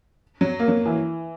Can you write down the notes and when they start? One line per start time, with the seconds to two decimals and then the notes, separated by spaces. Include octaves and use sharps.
0.41 F#3
0.59 A#3
0.68 F#3
0.86 E3